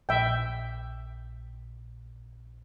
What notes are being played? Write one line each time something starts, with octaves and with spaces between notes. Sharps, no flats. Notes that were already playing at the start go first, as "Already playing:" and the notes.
A#1 E5 G5